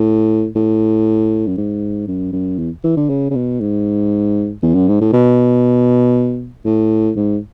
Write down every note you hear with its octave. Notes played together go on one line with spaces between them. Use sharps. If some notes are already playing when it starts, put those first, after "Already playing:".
Already playing: A2
A2
F#2
G#2
F#2
F#2
E2
E3
D3
C#3
C#3
B2
G#2
E2
F#2
G#2
A2
B2
A2
G#2